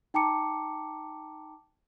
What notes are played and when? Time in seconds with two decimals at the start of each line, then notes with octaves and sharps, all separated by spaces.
0.14 D#4 G5 A5 A#5 D6 C#7